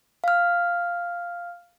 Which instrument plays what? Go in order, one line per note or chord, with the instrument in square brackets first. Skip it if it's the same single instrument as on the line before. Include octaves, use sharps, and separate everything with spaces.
[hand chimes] F5 F6